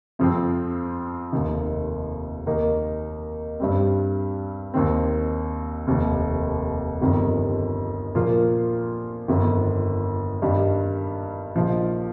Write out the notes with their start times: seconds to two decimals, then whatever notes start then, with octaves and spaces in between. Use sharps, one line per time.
0.19 F2 F3 C4
1.32 F1 D#2 D#3
2.46 D#2 D#3 A#3 D#4
3.60 G2 G3 C4
4.74 D#2 D#3 C4
5.87 F1 D#2 D#3
7.01 G1 F2 C3 D#3 G3
8.15 A#2 F3 A#3 F4
9.28 G1 F2 D#3
10.42 G2 D#3 G3 D#4
11.55 A#1 A#2 F3 D#4